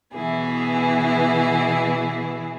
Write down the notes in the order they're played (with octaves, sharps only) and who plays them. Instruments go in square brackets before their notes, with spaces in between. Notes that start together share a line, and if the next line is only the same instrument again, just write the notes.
[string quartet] B2 E3 B3 E4 G#4